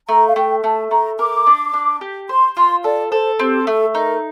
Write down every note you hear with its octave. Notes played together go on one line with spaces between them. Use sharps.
A3 A#5
F5
A3 G5
A3 A5
A3 A#5
A#4 D6
D4
D4
G4
C5 C6
F4 C6
A4 D5
A4 C5
C4 G4
A3 A4
D#4 A#4